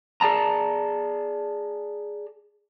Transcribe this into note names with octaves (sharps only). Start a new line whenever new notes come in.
G#4 D5 A5 A#5